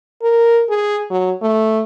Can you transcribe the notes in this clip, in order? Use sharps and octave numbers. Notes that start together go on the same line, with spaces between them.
A#4
G#4
F#3
A3